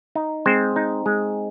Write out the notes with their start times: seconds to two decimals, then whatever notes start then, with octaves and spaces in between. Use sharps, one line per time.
0.15 D#4
0.46 G#3 C4 C5
0.76 D#4
1.06 G#3